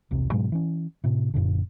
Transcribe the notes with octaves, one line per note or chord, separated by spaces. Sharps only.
E1 C2 C3
G#2 B2 F#3 G#3
E3 C#4
A2 C3
F#1 F#2 A#2 D3